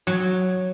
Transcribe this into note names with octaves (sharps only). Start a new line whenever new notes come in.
F#3